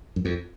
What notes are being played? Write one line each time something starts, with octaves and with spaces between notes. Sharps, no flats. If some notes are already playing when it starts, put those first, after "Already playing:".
F#2
F2